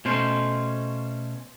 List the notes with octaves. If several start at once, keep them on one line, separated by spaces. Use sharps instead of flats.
B2 A3 C#4 C5